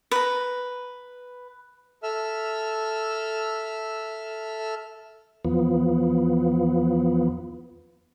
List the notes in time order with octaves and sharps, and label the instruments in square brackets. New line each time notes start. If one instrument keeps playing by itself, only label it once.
[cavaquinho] B4 A#5
[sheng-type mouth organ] A4 E5 E6 F6
[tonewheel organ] E2 F3 B3